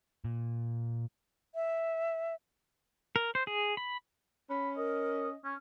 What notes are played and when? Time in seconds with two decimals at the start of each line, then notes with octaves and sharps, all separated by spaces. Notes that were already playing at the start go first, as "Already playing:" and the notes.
0.24 A#2
1.55 E5
3.16 A#4
3.35 C5
3.47 G#4
3.77 B5
4.50 C#4 B5
4.77 A#4 D#5
5.44 C#4